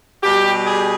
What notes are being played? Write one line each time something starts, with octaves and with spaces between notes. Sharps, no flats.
B2 G3 G4
G#4